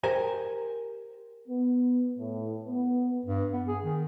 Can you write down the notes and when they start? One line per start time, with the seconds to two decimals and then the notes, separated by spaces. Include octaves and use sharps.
0.04 G4 A#4 C5 G#5
1.48 B3
2.19 A2
2.66 B3
3.25 G2
3.53 B3
3.67 G#4
3.84 D#3